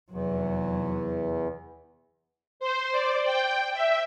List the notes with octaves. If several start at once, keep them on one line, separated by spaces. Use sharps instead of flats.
F1 E2 F#3
C5
D5
G5
E5